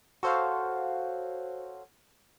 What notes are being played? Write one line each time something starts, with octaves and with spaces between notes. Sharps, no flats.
F#4 A4 C5 C#5 F5